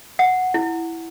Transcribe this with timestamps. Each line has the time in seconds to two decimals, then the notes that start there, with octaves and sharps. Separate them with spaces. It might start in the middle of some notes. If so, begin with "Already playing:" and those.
0.19 F#5
0.54 E4